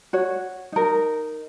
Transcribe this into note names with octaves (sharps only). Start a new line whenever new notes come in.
F#4 C#5
D#4 A#4